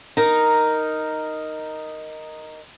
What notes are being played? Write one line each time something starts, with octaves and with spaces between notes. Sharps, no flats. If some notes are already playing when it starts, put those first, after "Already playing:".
D#4 A#4